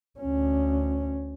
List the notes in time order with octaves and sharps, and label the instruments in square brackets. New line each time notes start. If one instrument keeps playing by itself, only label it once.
[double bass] D2 C#4